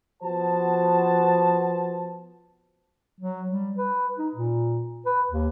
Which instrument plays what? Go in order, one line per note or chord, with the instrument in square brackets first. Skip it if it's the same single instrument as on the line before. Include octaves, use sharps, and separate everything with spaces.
[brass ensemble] F3 B3 F#4 C5 A5
[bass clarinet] F#3
G3
B4
D#4
A#2
B4
D#2